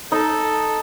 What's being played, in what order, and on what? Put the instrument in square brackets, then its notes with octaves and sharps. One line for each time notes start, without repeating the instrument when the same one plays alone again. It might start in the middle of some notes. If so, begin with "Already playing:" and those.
[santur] D#4 [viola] A4